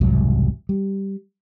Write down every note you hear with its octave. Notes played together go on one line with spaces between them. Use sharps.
E1 C2 G#2 F#3
G3